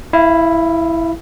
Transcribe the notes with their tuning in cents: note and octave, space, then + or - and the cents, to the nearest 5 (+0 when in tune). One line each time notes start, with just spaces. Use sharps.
E4 +0 F5 -35